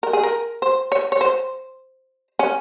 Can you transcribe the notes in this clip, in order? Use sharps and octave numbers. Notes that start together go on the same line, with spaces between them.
A#4
G#4
A#4
C5
C#5
C#5
C5
C#4